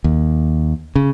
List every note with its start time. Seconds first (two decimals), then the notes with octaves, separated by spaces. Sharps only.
0.04 D#2
0.96 C#3